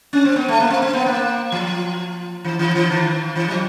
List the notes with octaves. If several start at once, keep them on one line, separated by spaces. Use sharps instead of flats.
C#4
C4
B3
A3
A#3
C4
C4
B3
A#3
F3
E3
E3
E3
D#3
E3
F#3